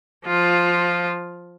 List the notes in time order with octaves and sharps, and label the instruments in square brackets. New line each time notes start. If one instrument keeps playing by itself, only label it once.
[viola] F3 F4